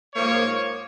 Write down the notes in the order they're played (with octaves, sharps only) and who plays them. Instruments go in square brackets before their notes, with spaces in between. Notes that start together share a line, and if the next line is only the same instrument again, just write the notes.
[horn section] G#2 F3 A#3 C#5